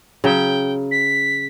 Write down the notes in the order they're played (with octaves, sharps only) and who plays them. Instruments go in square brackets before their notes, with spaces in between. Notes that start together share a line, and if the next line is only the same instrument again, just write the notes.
[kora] C#3 F#3 [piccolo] G5
[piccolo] B6